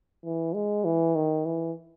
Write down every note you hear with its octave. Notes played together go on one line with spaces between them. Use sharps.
E3
G#3
E3
D#3
E3